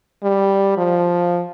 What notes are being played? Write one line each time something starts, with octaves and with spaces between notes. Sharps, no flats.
G3
F3